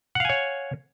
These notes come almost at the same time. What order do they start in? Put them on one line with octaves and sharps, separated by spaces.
F#5 F5 G#5 C#5